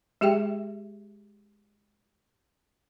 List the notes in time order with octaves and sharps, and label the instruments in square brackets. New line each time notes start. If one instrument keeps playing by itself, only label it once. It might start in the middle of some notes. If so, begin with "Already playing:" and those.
[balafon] G#3 G4 G#4 E5 G5